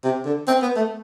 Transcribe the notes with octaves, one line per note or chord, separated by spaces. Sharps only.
C3
D3
C4
B3
A3